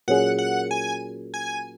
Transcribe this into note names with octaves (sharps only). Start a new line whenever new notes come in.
A#2 F#3 C#4 G#4 F#5
F#5
G#5
G#5